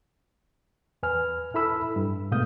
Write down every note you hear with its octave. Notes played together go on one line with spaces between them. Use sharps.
E2 B4 G#5 F6
E4 A4 B5 E6
G2
G#2 B2 A3 F5 D#6 G6